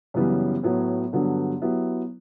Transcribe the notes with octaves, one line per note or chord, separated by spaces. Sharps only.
F#2 C#3 E3 G3 B3
A2 F#3 B3
G2 D3 F#3 B3
F#3 B3 E4 G4